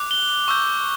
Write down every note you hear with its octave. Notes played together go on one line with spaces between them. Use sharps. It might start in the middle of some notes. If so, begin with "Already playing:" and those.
Already playing: D6 F#6
G7
C#6 E6 G6